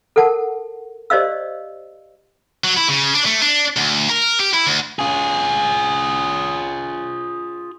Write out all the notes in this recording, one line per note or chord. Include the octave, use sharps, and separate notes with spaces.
A4 A#4 F#5 A5
G4 C5 D5 D#5 F5 E6
F#3
E4
C#3
D4
A3
D4
D2
A#4
G4
E4
D2
F4 G#4